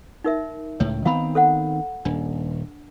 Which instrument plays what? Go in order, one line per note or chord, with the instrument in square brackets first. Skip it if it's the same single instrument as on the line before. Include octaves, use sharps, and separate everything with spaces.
[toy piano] D#4 A#4 E5
[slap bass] C#2 A2 [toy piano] C#5
[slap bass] D#3 B3 C4 [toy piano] F5 A#5 B5
[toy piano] A4 C5 F#5
[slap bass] D#1 [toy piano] D4